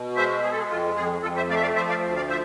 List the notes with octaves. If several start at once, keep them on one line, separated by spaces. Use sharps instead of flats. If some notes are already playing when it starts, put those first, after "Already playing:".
Already playing: B2
G#3 C5 E5
G#3 G#4
A4
G#4
F2 F4
F2 G#4
F2 F4 A4
C5 E5
A3 D5 F5
E5
D5 F5
F3 C5 E5
D5 F5
D2
D5 F5
F3 C5 E5